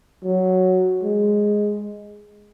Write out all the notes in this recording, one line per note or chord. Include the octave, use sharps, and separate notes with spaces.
F#3
G#3